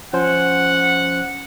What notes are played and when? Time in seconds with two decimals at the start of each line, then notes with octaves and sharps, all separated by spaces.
0.13 F3 C#4 C5 F#5